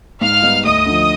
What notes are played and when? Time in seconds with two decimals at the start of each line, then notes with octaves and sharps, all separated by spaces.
0.21 G#2 F5 F6
0.42 G3 B3 D#4
0.64 D2 D#5 D#6
0.86 D3 F3